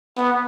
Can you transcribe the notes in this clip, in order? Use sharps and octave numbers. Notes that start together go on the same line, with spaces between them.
B3